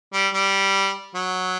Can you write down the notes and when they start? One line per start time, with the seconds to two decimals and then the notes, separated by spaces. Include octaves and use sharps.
0.13 G3
0.34 G3
1.15 F#3